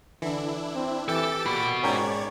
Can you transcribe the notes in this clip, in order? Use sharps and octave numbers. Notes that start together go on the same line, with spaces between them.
D3 E3 D4 E4
C4
E3 G4 A4 G5 D6 A6
A#2 F#4 B5
G#2 C#4 A#4 C#5 D5 G5 G#6